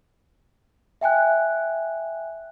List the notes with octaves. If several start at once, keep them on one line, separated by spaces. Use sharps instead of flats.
E5 G5 G#5 F#6